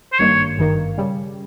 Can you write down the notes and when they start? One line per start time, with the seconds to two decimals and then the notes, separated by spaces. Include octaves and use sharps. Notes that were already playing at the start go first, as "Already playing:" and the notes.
0.13 C5
0.19 G#1 G2 D#3 A#3 C#5
0.58 G#1 G2 D#3 A#3
0.98 C#3 G3